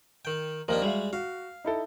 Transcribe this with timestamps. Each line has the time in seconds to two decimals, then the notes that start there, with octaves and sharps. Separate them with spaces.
0.25 D#3 G5
0.68 D#2 F3 A#3 D4 A#4 D#5
0.82 G3 G#3 F#4 E5 F5
1.13 F#4 F5
1.65 D#4 E4 A4